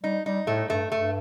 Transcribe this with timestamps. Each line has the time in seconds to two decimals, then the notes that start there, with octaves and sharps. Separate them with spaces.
0.04 G3 D#4
0.25 G3 D#4
0.47 A2 A3
0.70 G2 A3
0.92 G2 A3